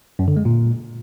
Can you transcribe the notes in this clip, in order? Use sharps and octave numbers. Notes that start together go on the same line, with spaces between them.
F#2
D3
G#3
A#2